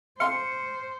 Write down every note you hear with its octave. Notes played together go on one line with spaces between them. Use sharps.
C5 F5 C6 C#7